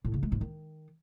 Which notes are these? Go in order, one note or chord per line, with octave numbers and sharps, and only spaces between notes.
A2
C#3
G#3
G#2
D#3